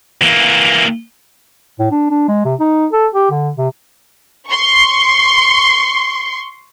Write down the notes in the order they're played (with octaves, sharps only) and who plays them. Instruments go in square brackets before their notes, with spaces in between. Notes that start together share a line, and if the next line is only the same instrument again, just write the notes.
[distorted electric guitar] E3 A#3
[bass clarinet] A2
D4
D4
G#3
C3
D#4
A4
G4
D3
C3
[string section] C6 C#6